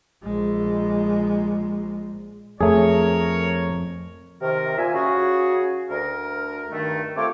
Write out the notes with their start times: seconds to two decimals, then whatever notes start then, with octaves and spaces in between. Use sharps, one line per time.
0.23 A#1 G#3
2.61 F2 A3 G#4 A#4 C#5
4.42 C3 D#3 A#4
4.78 A#2 E5 G#5
4.94 C#3 F#4 G#4
5.89 D2 A#4
6.70 G2 D#3 A3
7.17 A3 C4 F4 G4 C#5 D6